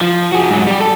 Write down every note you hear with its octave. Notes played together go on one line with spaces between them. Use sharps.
F3
F#4 G#4
G#2 F#3
G3 G4
A4